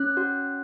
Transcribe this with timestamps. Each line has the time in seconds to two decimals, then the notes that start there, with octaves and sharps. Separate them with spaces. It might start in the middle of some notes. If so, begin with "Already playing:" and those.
Already playing: C#4 F#6
0.17 F#4